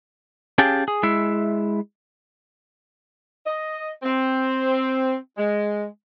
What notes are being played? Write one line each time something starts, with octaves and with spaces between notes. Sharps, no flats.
C#4 G4 G#4 F5 G5 A5
G#4
G#3 E4 E5
D#5
C4
G#3